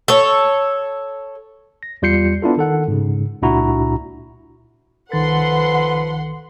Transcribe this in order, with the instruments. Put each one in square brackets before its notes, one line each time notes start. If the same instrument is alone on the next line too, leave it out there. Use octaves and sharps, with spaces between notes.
[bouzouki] A4 C#5
[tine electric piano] A#6
E2 G3 F4 G6 C7 C#7
B3 D4 E4 F4 A4
D#3 A4 F#5
G#2 C#3
C#2 A#2 D4 E4 F#4 A#5
[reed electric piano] C2 D#3 A6 [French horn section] F3 A4 B4 [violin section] F#5 C6